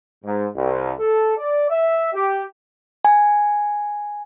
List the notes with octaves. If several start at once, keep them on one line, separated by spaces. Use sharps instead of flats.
G#2
C2
A4
D5
E5
G4
G#5